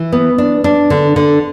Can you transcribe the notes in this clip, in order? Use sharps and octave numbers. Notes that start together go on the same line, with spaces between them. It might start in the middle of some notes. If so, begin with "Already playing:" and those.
Already playing: E3
B3
D4
D4
D3
D3